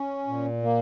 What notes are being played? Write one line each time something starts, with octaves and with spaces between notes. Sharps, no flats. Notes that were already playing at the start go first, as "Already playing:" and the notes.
Already playing: C#4
A#2
A#3